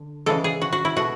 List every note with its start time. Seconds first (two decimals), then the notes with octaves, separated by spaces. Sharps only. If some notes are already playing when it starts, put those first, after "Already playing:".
Already playing: D3
0.26 C#3 E3 G#3 A4
0.44 G#4
0.61 F#4
0.73 F#4
0.85 E4
0.96 B2 A3 F#4